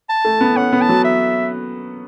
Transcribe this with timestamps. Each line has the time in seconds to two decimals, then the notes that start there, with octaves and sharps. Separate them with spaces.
0.09 A5
0.25 A3
0.41 B3
0.56 C#4 F#5
0.72 B3
0.81 A5
0.89 F#3
1.05 E5